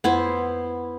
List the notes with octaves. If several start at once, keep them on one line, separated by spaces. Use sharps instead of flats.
F2 B3 E4 C5 F#5 G#6